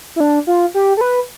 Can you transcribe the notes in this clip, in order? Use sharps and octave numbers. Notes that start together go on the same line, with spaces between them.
E4
D4
F4
G4
A4
B4